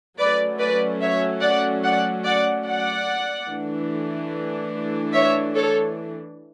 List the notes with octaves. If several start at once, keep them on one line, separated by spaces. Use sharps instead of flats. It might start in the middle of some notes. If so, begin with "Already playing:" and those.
F#3 A3 C#4 B4 D5
B4 D5
C#5 E5
D5 F#5
D5 F#5
D5 F#5
D5 F#5
E3 A3 D4
C#5 E5
A4 C#5